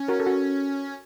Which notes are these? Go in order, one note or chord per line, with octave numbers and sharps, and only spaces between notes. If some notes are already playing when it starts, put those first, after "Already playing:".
Already playing: C#4
F#4 A#4
A4
F#4